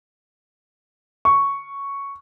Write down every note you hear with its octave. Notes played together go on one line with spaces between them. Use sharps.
C#6